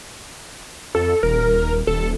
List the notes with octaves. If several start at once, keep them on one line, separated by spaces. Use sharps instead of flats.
F2 A4
D#1 A#4
D#1 A4